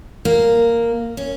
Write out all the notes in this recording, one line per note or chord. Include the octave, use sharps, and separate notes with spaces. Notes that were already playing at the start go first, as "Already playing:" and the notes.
A#3
C#4